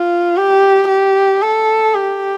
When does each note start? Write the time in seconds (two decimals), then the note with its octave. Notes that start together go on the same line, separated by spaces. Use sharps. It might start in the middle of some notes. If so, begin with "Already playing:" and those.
Already playing: F4
0.37 G4
0.88 G4
1.42 A4
1.95 G4